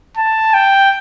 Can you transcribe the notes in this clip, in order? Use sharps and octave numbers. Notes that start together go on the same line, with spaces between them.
A5
G5